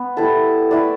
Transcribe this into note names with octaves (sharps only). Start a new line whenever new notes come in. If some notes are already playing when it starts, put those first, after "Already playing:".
Already playing: B3
G3 E4 A4 E5
A3 E4 B4 D5